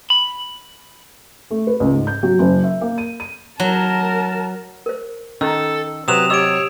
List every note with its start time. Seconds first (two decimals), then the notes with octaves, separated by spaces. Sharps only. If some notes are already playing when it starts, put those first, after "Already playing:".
0.10 B5
1.51 A3
1.67 B4
1.80 C#2
1.93 G#2
2.07 G6
2.23 F#3
2.39 F#1
2.64 E5
2.81 A#3
2.98 D#7
3.20 D#7
3.60 F#3 A#4 A5
4.86 A#4 C5
5.41 D#3 C#4 A4 A#5 E6
6.08 C3 F#3 B4 D#6 E7 F7
6.30 G4 C#5 D#5 D6 E6 D7